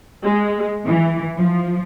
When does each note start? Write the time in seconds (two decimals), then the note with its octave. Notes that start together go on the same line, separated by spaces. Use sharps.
0.24 G#3
0.85 E3
1.38 F3